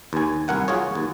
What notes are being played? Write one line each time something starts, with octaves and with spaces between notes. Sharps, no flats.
D#2 G#5
C2 A#4 F#5 G#5
F4 F#4 G#4 C#5
D#2